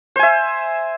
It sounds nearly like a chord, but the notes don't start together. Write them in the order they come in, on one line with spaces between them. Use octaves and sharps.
C5 G#5 E5